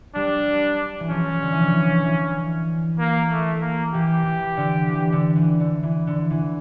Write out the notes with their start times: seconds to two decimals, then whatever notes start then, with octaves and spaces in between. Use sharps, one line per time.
0.15 G3 D4
1.00 E3
1.10 F3 C#4
1.42 D3
1.52 E3
1.62 D3
1.73 E3
2.05 E3
2.99 A#3
3.31 A3
3.62 A#3
3.94 E3 G4
4.26 E3
4.57 D3
4.89 E3
5.12 D3
5.36 E3
5.60 D3
5.83 E3
6.07 D3
6.30 E3